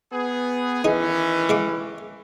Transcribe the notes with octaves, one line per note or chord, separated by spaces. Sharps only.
B3 G#4
D#3 E3 C#4 D#4 G#4
G#3 F5 D6